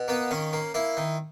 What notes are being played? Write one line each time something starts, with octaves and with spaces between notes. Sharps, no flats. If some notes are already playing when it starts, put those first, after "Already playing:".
Already playing: B2
A#3 B3
D#3 C#4
A#3
A#3 E4
D#3